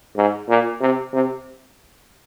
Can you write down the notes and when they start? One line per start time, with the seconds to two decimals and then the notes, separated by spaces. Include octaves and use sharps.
0.17 G#2
0.49 A#2
0.81 C3
1.13 C3